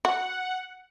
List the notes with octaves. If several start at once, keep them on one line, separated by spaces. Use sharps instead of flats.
F#4 F#5